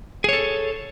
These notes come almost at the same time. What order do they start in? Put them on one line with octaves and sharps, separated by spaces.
G#4 C#5 A4